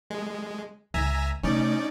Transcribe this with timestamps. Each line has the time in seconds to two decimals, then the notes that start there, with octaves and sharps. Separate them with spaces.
0.10 G#3
0.94 C#2 E5 G#5 A#5
1.43 C3 A3 C#4 D#4 D5